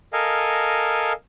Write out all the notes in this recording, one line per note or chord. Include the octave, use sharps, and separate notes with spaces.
A4 A#4 D#5 F5 G#5